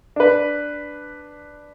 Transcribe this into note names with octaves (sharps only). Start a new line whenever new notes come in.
D4 B4